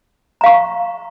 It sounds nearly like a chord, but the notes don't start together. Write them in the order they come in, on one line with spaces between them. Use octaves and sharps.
A#5 F5 C#6